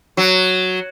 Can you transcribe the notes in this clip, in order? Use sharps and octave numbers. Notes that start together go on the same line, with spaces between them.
F#3